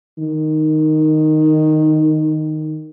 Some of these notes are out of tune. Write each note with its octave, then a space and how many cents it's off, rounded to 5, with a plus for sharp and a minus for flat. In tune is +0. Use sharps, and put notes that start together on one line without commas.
D#3 -5